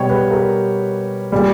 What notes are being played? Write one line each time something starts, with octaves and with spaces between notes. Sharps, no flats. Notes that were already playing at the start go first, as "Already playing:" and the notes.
Already playing: B2 G3 C#5 G5
B4
A#4
A#2 G3